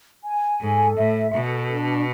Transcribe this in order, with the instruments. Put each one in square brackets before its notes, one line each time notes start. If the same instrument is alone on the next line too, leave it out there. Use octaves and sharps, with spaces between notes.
[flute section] G#5
[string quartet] G#2 [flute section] A4
[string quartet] A2 [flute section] E5
[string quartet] B2 [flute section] A4
[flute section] D4